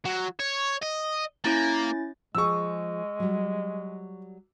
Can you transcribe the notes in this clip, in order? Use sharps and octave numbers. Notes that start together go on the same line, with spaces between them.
F#3
C#5
D#5
A#3 C#4 E4 A6
F3 G#3 G#4 C#6 E6
F#3 G3